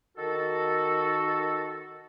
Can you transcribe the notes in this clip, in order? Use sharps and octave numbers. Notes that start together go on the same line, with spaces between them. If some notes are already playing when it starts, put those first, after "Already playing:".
D#3 F#4 A4